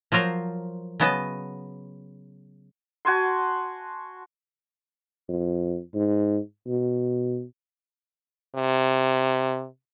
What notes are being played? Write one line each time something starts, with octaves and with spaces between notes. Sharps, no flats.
F3 F#3 F4 A#4 C5
C#3 F#3 B3 D#5 A5
F#4 G#5 A5 C6
F2
G#2
B2
C3